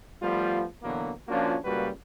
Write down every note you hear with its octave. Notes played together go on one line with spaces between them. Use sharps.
F3 G3 A3 B3 F4
B2 D3 E3 F#3 A#3 B3
F3 A#3 C#4 D4 F4 F#4
C#2 A#2 G3 A#3 F#4 B4